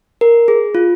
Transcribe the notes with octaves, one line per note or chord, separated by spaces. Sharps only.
A#4
G#4
F4